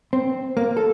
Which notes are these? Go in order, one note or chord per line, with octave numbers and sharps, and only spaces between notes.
C4
A#3
A4